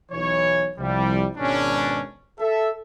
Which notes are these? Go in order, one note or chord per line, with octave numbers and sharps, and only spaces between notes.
B1 E3 C#5
C2 F3 G3
G#1 B2 C#4 D4
A4 E5